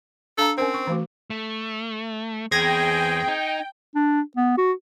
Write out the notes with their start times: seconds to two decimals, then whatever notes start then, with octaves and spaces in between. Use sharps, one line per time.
0.38 D4 A4 F5 A#5
0.58 C4 C#4 A#4 C5
0.74 C#6
0.87 E3 A3 F#4
1.30 A3
2.52 E2 C4 G#4 G5 G#6 A#6
3.28 D#4
3.95 D4
4.36 B3
4.58 F#4